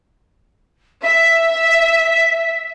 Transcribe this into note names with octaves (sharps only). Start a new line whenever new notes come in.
E5 B6